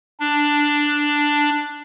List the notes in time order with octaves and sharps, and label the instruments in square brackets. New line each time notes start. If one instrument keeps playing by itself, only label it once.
[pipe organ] D4